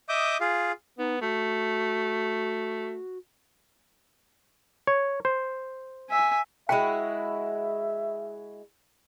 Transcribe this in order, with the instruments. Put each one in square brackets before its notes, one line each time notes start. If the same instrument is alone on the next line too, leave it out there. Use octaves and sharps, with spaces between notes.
[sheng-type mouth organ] D#5 E5 D6 D#6 G6
F4 G#4 F5
[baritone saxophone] B3 [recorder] D#4
[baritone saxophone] A3 [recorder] F#4
[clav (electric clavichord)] C#5
C5
[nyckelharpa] E5 G#5
[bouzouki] G#3 E4 F#4 [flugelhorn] E5 [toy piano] G5